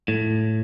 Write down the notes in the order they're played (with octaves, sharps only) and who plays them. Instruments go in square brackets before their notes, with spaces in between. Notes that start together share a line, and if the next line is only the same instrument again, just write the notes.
[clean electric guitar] A2